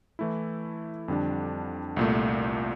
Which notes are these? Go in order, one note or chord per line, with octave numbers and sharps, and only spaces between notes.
E3 A3 E4
F2 D3 G3 D4
C2 A#2 A3